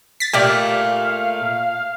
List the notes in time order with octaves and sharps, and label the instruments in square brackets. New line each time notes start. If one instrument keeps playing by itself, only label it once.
[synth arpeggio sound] A6 B6
[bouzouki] A#2 A3 [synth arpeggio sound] G4 D5 [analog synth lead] F5